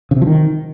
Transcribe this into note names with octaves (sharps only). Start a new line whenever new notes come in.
C#3
C3
F3
D#3